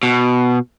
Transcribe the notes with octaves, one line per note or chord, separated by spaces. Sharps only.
B2